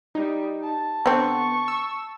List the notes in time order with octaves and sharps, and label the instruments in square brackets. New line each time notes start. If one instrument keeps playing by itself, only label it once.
[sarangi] G3 [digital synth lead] D#4
[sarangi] A5
[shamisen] D3 C4 [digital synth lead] B3 [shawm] C#6
[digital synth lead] E6